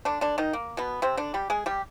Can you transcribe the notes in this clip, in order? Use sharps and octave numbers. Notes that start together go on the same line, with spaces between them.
D3 D4
D3 D4
D#3 D#4
A#3
B2 B3
C3 C4
D3 D4
G3 G4
G#3 G#4
G3 G4